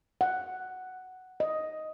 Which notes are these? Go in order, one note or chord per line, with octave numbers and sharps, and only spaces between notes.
F#5
D#5